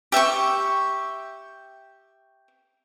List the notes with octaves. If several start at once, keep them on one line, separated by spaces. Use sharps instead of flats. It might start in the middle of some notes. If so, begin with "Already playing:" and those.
G4 E5 G5 C#6